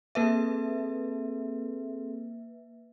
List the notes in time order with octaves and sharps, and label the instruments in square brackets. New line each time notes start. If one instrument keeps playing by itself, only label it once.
[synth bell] A#3 B4 E5 [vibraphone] C4 G#4 A4